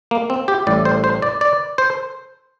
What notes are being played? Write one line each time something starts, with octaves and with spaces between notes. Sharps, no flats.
A#3
C4
G4
A1 A2 G3 D5
C5
C5
D5
D5
C5